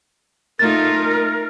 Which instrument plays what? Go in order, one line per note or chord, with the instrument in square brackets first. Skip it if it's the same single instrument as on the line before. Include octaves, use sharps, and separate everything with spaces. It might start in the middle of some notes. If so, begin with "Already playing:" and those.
[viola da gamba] A3 D#4 F4 [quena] A#4 [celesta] A6